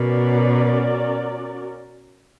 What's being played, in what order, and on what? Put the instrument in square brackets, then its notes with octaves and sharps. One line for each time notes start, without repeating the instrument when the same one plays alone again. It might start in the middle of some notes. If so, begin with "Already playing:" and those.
Already playing: [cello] B2 [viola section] C#4 F#4 A#4 D5